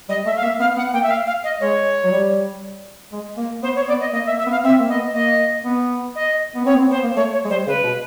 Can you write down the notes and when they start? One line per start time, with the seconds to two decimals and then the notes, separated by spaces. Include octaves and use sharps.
0.09 G3 D#5
0.26 A3 E5
0.36 F5
0.43 A#3 E5
0.60 B3 F5
0.77 B3 F#5
0.93 A#3 G5
1.03 E5
1.10 F5
1.27 F5
1.44 D#5
1.60 G#3 C#5
2.04 F#3
2.11 G3
3.12 G#3
3.37 A#3
3.63 B3 C5
3.75 C#5
3.88 B3 D5
4.00 D#5
4.13 A#3 D#5
4.26 E5
4.30 A#3
4.38 E5
4.46 B3
4.51 F5
4.64 C4 E5
4.79 A#3
4.89 B3 D#5
5.14 A#3 D#5
5.65 B3
6.15 D#5
6.56 B3
6.65 C4 C#5
6.73 B3
6.78 C4
6.91 B3 C5
7.03 A#3
7.16 A3 C#5
7.33 C#5
7.45 G#3
7.50 G3 C5
7.67 C#3 B4
7.84 B2